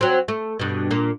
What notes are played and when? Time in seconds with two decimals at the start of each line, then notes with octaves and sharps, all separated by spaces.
0.01 F#3 C4
0.28 A3
0.59 G2 B2
0.91 A#2 A#3